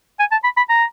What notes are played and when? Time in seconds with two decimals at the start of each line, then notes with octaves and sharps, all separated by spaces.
0.20 G#5
0.32 A5
0.44 B5
0.57 B5
0.69 A#5